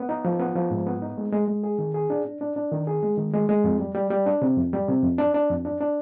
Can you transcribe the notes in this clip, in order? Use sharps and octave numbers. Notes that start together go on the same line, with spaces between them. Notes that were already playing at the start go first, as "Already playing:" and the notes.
Already playing: B3
D#4
F3
B3
F3
G#2
B3
D#4
G#3
G#3
G#3
G#4
D#3
G#4
D4
D4
D4
D4
D#3
G#4
G#3
D#3
G#3
G#3
F2
G3
G3
G3
D4
C3
F2
G3
C3
F2
D4
D4
F2
D4
D4